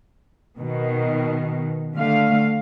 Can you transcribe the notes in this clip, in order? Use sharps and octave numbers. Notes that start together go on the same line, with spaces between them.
B2 D#3
D3 A3 F5